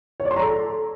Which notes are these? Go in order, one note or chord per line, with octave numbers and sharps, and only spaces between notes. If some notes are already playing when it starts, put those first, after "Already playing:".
C#5
D5
C6
A#5
A4